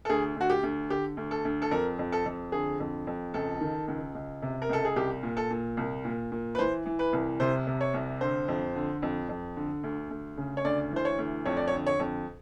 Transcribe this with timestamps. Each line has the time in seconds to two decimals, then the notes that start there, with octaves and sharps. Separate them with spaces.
0.05 A4
0.09 D2 G#4
0.36 D2 F#4
0.50 G4
0.63 D2
0.90 D3 G4
1.17 D2
1.31 A4
1.45 D2
1.62 A4
1.71 F2 A#4
1.99 F2
2.12 A4
2.26 F2
2.52 D3 G#4
2.80 F2
3.07 F2
3.34 C#2 A4
3.61 D#3
3.88 C#2
4.15 C#2
4.42 C3
4.62 A#4
4.69 C#2 A4
4.85 G#4
4.96 C2 G4
5.23 A#2
5.37 A4
5.50 A#2
5.77 C2
6.04 A#2
6.32 A#2
6.55 B4
6.59 E3 C5
6.86 E3
6.99 B4
7.13 C2
7.40 C3 C5
7.67 C3
7.81 C#5
7.94 C2
8.21 D3 C5
8.48 F2
8.75 D3
9.02 F2
9.29 F2
9.56 D3
9.84 D2
10.11 D2
10.37 C#3
10.57 C#5
10.65 D2 D5
10.91 E3 C5
11.05 C#5
11.19 D2
11.46 F2 C#5
11.57 D5
11.68 C#5
11.73 D3
11.87 C#5
11.99 F2